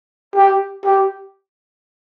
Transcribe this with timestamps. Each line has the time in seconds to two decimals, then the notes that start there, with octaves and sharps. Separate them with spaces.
0.36 G4
0.85 G4